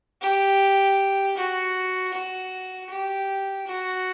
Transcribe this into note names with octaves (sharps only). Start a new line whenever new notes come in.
G4
F#4
F#4
G4
F#4